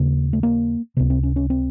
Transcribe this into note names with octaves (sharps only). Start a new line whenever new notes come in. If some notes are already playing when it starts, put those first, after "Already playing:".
Already playing: D#2 C#3 A#3
A3
A#3
C#2 C3 B3
C4
C#4
C#4
C4